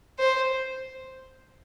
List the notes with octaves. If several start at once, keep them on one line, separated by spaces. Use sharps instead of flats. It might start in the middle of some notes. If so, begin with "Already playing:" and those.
C5